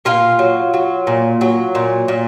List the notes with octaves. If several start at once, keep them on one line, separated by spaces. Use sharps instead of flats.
A#2 F4 F5
F#3
F#3
A#2
F#3
A#2
A#2